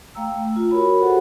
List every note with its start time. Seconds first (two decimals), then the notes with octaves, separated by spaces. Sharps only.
0.15 A3 F5 G5 A#5 E6
0.56 F4
0.71 F#4 A#4 C#5 B5
1.01 F#4 G4 A4 C5 F#5